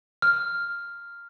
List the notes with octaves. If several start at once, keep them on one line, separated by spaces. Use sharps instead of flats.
F6